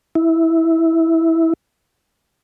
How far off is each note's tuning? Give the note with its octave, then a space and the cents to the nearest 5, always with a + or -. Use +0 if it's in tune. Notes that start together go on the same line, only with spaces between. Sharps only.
E4 -10